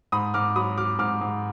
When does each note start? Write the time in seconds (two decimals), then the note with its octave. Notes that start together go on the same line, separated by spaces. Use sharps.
0.12 G#2 B5 D#6
0.34 G#2 D6 F6
0.56 F#3 B5 D#6
0.78 F#3 D6 F6
0.99 G#2 D6 F6
1.21 G#2